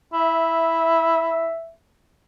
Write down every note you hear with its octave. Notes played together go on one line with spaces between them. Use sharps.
E4 E5